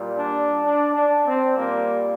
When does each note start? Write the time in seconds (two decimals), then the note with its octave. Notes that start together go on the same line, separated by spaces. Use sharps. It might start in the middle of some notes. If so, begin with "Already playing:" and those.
Already playing: A#2 G3
0.17 D4
0.63 D4
0.95 D4
1.26 C4
1.57 A#2 G3 A#3